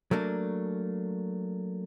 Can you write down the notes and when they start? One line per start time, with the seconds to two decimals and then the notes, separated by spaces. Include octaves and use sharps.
0.11 F#3 A3 A#3 D4